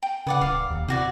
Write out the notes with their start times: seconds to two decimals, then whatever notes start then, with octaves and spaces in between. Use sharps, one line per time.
0.03 G5
0.27 C#3 B4 D5 F#5
0.41 D1 F5 D6
0.71 D#2
0.88 C3 E4 F#4 D5